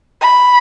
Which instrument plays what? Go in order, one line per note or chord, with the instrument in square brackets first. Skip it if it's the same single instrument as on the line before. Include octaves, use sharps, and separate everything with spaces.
[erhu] B5